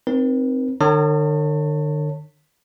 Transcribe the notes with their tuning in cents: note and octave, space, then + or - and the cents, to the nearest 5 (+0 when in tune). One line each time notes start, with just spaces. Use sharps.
C4 +0 D#4 -10 A#4 +40
D3 +45 C#5 -15 A5 +30